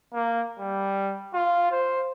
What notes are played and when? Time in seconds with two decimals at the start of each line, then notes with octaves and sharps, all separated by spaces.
0.14 A#3
0.59 G3
1.34 F4
1.72 C5